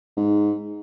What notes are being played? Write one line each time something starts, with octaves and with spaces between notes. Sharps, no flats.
G#2